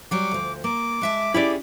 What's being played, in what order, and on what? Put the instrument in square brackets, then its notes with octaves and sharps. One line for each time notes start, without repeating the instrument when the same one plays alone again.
[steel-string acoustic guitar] F#3 G3 C#5 [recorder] D6
[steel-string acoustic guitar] D2 F3
[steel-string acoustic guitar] A#3 [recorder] D6
[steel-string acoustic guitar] G#3 E5 A5
[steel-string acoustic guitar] C#4 G4 G#4 [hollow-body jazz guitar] E4 D5